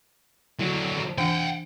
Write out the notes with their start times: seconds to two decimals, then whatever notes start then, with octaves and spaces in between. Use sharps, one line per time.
0.59 D3 F#3 E4
1.18 E3 D4 F#5 G5